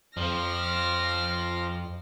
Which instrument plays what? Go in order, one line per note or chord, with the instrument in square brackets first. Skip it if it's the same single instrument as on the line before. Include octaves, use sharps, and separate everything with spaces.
[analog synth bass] F2 [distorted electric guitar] F3 [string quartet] D6 F6 A#6